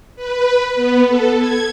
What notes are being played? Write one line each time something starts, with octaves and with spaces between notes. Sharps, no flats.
B4
B3
A4
G#6